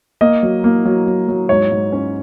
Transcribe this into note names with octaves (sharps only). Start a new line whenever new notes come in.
A#3 D#5
F#3
A#3
F#3
F#3
F#3
G#2 C#5
G#2
C#4